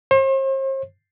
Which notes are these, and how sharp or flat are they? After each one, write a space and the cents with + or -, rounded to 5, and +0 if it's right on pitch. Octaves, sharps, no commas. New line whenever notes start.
C5 +40